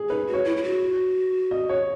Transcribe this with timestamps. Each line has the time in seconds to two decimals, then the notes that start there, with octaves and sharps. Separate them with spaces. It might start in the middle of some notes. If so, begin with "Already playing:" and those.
Already playing: G#4
0.09 D#4 B4
0.27 F#4
0.33 C#5
0.45 E4
0.57 E4
0.63 F#4
1.51 D#5
1.69 C#5